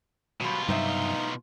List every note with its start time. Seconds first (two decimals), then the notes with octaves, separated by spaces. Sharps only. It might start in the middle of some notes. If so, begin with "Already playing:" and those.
0.41 B2 F#3 G3 F4
0.68 G2 C3 F#3 D#4 G4 C5 E5